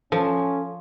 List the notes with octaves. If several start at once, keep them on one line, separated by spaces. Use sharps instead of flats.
F3 C#4 A4